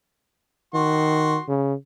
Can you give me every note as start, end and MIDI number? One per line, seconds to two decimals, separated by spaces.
0.74 1.38 51
0.74 1.45 66
0.74 1.45 84
1.48 1.74 49